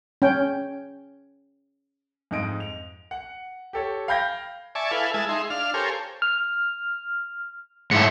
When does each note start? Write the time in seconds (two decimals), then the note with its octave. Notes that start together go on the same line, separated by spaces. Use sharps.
0.22 C#4 G5
2.31 F2 G#2 D#5 D7
2.60 F7
3.11 F#5
3.73 G4 A4 C#5
4.08 F5 G5 B5 G6 G#6 A#6
4.75 D5 E5 G#5 A5 C#6
4.91 E4 A4 B4 F5 G#5
5.14 G#3 E4 G#5 A5 E6
5.29 D#4 G#4 E5 C6
5.50 D4 F5 F6
5.74 G4 A4 A#4 C5 C#5 G#5
6.22 F6
7.91 G#2 E4 C#7